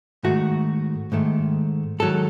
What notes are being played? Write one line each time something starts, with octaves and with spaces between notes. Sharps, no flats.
G#2 D#3 A3 F#4
G#2 D#3 A3
G#2 D#3 F#3 A4